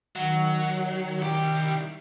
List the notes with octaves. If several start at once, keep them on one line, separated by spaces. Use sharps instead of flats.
D#3 F#3
C2 G4